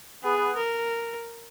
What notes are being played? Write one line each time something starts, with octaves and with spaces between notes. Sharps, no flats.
B3 G#4
A#4